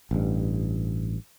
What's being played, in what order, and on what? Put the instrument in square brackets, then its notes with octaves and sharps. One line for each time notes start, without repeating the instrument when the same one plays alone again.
[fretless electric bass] A1 G2